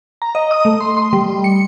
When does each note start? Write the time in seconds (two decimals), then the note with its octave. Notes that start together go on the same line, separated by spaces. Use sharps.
0.22 A#5
0.35 D#5
0.51 D#6
0.65 A3
0.80 C6
0.97 C6
1.13 G3
1.44 C#7